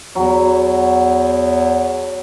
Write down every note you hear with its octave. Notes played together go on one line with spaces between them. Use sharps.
E2 F#3